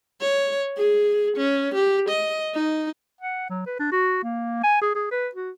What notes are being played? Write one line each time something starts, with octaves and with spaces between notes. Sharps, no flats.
C#5
G#4
C#4
G4
D#5
D#4
F#5
F#3
B4
D4
F#4
A#3
G#5
G#4
G#4
B4
F#4